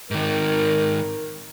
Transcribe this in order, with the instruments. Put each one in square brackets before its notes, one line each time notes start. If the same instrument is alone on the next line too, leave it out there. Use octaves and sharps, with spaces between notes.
[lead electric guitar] G#2 D#3 [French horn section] A#4